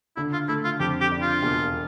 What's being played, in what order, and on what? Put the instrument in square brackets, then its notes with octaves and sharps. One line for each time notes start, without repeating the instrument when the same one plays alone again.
[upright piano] D3 [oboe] E4
[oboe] F4
[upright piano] A3 [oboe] E4
[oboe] F4
[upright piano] F2 [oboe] G4
[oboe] G4
[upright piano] D4
[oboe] F4
[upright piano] E1